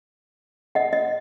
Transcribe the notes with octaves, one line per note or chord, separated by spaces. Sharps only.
D#5 F#5
D#5